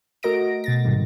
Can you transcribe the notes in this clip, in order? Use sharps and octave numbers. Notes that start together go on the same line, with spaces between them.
A3 F#4 A#4 D#5 A#6 D7
B2 A6 A#6
G#2 C3 D#3 G3